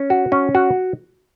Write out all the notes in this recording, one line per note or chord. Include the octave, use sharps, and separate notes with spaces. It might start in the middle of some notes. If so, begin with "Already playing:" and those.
Already playing: C#4
F#4
C#4
F#4